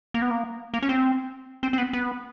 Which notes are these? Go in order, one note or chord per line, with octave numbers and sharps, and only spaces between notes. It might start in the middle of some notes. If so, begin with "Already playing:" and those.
A#3
B3
A#3
A#3
C#4
C4
C4
C4
B3
B3